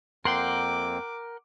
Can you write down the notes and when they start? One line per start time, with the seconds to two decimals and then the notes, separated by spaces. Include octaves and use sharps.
0.25 F2 A#3 C4 A#4 F#5 G5 C6 D6